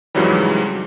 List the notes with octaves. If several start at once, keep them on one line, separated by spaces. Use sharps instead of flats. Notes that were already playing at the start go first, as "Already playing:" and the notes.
F2 G#2 C#3 E3 F#3 G3